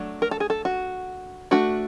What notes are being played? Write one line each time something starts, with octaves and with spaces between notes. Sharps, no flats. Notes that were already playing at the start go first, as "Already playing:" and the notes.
Already playing: F#3 A3 D4
A#4
A4
G#4
A4
F#4
A3 D4 F#4